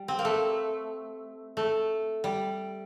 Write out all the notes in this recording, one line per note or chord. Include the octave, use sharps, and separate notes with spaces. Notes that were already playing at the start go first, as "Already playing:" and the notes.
Already playing: G3
C4
A#3
A3
A3
G3